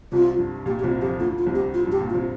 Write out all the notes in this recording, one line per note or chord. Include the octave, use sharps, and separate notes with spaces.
C2 C3 F4
G2
A#2 G4
G4
C2 C3 F4
F2 F3 G4
D2 D3 F4
F4
C2 C3
G4
F4
G2 G4
A#2
F4
C3